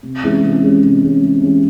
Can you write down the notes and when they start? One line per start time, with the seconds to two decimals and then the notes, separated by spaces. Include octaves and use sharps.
0.03 C3
0.23 E3 G#3 C#4
0.43 C3
0.63 E3 G#3 C#4
0.83 C3
1.03 E3 G#3 C#4
1.23 C3
1.42 E3 G#3 C#4